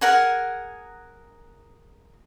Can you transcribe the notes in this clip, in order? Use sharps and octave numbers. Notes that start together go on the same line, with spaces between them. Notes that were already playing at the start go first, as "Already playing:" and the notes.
G#4 A#4 F#5 G#5